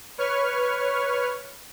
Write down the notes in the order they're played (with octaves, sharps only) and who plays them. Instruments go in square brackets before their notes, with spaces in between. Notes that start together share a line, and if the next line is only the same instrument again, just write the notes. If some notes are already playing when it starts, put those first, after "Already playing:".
[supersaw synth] B4 C#5 C#6 F6